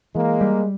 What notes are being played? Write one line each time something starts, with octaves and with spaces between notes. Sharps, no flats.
E3 G#3 A#3
G3